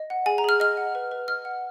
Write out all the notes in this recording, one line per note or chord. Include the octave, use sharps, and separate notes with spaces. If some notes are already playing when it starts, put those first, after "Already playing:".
Already playing: D#5
F#5
G#4 G#5
A#5
G#4 F6
D#5 F6
F#5
B4
B4
D#5 F6
F#5